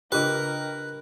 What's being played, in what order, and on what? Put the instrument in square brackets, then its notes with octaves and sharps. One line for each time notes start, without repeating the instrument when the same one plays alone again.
[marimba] C#3 D4 F4 [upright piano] G4 D#5 [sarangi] A#4 [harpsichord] B4